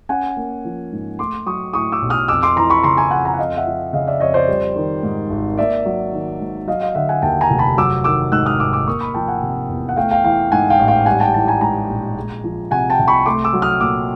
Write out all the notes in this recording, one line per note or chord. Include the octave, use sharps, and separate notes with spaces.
C#4 F#5 G#5
A#3
F3
G#2
A3 C6 D6
F#3 C#6 D#6
A2 C#6 D#6
D6 E6
B1
D#6 F6
F2 D6 E6
C6 D6
E3 A#5 C6
B5 C#6
C#3 A#5 C6
G#5 A#5
F2 F#5 G#5
G#5 A#5
F#5
F2 D#5 F5
E5 F#5
F3
C#3 D#5 F5
D5 E5
F2 C#5 D#5
C5 D5
G3
D#3
G#2
G#1
A#3 D5 E5
F#3
D#3
G#2
F#3 D#5 F5
D#5 F5
D3 E5 F#5
F#5 G#5
D#2 G5 A5
G#5 A#5
F1
A5 B5
F#3 D6 E6
D#3 D6 E6
G#2 E6 F#6
D#6 F6
G#1 D6 E6
D6 E6
A#3 C#6 D#6
B5 C#6
F3 G5 A5
F#5 G#5
C3
E2
F#5
A3 F5 G5
F5 G5
E3 F5 G5
G#2 F#5 G#5
F5 G5
A1
F5 G5
G3 F#5 G#5
G5 A5
E3 G5 A5
G#5 A#5
G#2 G#5 A#5
A#1
G#3
F3
C3 F#5 G#5
G5 A5
C2
B5 C#6
A3 C6 D6
D6 E6
F#3
D#6 F6
A#2 D6 E6